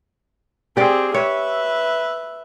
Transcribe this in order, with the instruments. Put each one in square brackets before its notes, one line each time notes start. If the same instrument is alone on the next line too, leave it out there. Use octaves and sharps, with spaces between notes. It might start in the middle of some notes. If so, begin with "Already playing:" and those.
[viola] C4 G#4 [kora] G4 D5
[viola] B4 E5 [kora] C#5